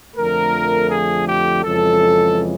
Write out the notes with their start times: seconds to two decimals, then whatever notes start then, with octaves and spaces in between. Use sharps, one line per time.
0.16 F2 D3 F3 A3 A#4
0.90 G#4
1.27 G4
1.63 F2 C#3 E3 G#3 A4